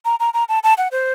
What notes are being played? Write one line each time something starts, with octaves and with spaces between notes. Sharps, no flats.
A#5
A#5
A#5
A5
A5
F#5
C5